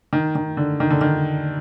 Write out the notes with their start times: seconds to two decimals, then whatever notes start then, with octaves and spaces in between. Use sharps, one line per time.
0.13 D#3
0.35 D#3
0.57 D3
0.80 D#3
0.90 D3
1.01 D#3